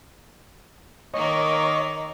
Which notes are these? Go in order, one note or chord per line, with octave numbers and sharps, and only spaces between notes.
D#3 A#3 A#4 C#5 D#5